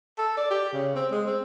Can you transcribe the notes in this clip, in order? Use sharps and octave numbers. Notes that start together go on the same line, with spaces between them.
A4
D5
G4
C#3
C4
G#3
C4